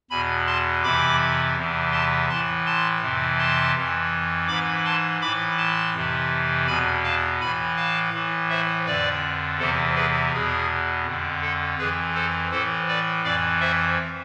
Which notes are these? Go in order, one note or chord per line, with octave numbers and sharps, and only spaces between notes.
E2 B2 G#5 B5
A5 C6
F2 C3 E3 B5 D6
E2 C3 E3
A5 C6
A2 E3 A5 C6
A5 C6
F2 C3 E3
A5 C6
F2 E3
G#2 E3 B5 D6
A5 C6
A2 E3 B5 D6
A5 C6
F2 C3 E3
E2 B2 G#5 B5
F5 A5
A2 E3 G#5 B5
F5 A5
A2 E3
C5 E5
F2 D3 B4 D5
E2 C3 E3 A4 C5
G#4 B4
E2 B2 G#4
F2 D3
A4
F2 E3 G#4 B4
A4 C5
A2 E3 A4 C5
B4 D5
F2 E3 D5 F5
C5 E5